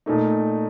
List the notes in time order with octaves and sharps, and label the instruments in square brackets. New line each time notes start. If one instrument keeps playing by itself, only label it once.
[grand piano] A#2 A3 D#4